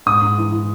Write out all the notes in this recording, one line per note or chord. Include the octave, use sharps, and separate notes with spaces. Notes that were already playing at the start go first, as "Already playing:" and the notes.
G#2 D#6
G#2
E3
E3